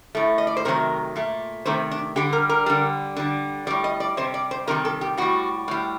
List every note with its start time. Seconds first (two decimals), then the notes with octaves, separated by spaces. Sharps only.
0.15 A2 A3
0.38 D#5
0.47 D5
0.57 C5
0.65 C3 D#3 F#3 A3 A#4
1.16 A#2 A3
1.65 C3 D#3 A3 C5
1.91 D4
2.16 D3 G3 G4
2.33 A#4
2.49 A#4
2.66 D3 G3
3.16 D3 G3
3.67 G3 D5
3.70 A2
3.84 D#5
4.00 D5
4.17 C3 G3 C5
4.34 D5
4.51 C5
4.67 C3 D#3 G3 A#4
4.85 A4
5.01 G4
5.17 A2 G3 F#4
5.68 A2 G3